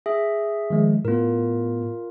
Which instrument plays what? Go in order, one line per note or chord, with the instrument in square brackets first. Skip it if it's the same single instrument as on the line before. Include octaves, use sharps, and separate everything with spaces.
[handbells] G#4 E5
[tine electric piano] D#3 F3 G#3
[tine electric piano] A2 B3 [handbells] F4 A#4